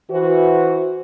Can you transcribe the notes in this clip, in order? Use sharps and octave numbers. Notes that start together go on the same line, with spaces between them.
E3 F#4 C5